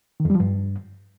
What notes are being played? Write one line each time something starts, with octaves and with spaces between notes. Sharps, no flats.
D#3
F2
G3
F3
G2